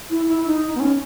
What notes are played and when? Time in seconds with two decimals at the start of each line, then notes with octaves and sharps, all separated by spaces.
0.10 E4
0.28 E4
0.45 D#4
0.75 B3
0.80 C#4